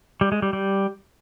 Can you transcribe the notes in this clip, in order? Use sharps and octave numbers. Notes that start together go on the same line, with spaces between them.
G3
G#3
G3
G3